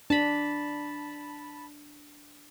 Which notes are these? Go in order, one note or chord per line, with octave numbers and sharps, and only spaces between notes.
D4 A5 B5